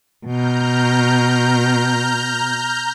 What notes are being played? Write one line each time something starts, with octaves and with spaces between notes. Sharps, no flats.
B2 A#5 F6 G6